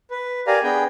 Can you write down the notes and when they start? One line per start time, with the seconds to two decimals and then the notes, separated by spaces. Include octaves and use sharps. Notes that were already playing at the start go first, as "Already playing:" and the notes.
0.11 B4
0.47 G4 A#4 D5 F5 G#5 A#5
0.63 B3 D4 G#4 G5